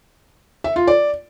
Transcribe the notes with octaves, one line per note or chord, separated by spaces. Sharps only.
E5
F4
D5